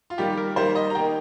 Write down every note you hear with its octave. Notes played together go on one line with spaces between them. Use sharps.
F4
D#3 G3 A#3 G4
A#4
D#3 G3 A#3 C5
D#5
A#5
D#3 A#3 G5